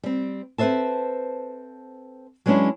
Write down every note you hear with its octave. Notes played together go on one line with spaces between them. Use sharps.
G3 C4
C4 A4 B4 C5 E5 A5
F#3 G#3 B3 C#4 D4 E4